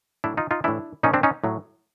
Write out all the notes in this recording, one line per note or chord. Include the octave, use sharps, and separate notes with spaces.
A2 F#3 D4 E4
D#4 F4
D#4 F4
A2 E3 D4 E4
A#2 F3 C#4 D#4
C4 D4
C#4 D#4
A2 F#3